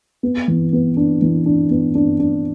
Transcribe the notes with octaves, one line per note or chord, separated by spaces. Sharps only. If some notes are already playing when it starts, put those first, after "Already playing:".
B3
E3
B3
D4
E3
D4
B3
D4
D4